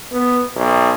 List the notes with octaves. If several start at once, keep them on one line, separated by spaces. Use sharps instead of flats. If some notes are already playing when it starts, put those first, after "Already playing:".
B3
B1